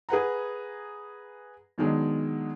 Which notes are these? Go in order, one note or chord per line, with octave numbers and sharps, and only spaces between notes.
G#4 B4 F#5 A#5
B2 D#3 F#3 G#3 D4